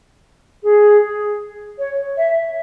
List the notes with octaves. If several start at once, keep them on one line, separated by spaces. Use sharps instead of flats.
G#4
C#5
E5